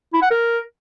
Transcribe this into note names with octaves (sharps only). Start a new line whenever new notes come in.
E4
F#5
A#4